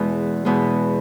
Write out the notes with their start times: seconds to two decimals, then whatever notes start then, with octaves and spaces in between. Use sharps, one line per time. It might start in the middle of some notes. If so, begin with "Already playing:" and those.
Already playing: E2 B2 G#3
0.45 E2 B2 G#3